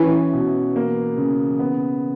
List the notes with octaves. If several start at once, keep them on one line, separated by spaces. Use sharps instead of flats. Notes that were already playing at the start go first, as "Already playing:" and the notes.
Already playing: E3 C#4
B2
A#3
C#3
B3